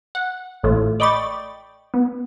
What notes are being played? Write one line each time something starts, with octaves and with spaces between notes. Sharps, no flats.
F#5
A1 A2 A3 F4
D5 D#5 G5 B5 C#6 A6
B3